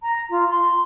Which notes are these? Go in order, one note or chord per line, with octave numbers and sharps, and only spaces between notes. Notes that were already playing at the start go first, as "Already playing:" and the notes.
A#5
F4
C6